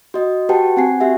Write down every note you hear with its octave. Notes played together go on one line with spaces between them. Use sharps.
F#4 D#5
F#4 G4 B4 F#5 G5 A5
C4 F#5 G#5 C7
F#4 G4 E5 F#5